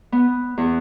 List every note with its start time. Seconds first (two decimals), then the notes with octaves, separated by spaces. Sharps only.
0.12 B3
0.57 E2